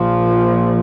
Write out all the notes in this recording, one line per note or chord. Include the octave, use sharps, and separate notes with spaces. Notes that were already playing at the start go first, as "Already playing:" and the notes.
Already playing: A#1 A#2 F3